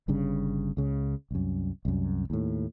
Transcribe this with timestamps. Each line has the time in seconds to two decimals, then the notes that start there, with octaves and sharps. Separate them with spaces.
0.08 G1 G2 C#3 C#4
0.77 C#2 C#3
1.31 C2 F#2
1.85 C2 F#2
2.30 D#2 A2